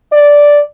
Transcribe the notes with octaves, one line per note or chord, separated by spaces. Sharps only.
D5